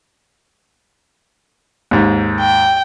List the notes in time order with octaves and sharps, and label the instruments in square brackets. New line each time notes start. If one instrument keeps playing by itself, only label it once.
[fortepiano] D#2 G#2
[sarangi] G5